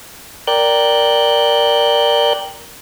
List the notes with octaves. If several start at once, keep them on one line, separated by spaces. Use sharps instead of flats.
A#4 D5 G5 F#6 G6